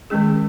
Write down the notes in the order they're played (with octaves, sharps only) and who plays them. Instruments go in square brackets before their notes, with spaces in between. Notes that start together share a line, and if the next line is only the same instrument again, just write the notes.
[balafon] D#3 G#3 C#4 G#4